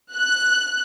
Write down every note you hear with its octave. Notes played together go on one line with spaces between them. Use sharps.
F#6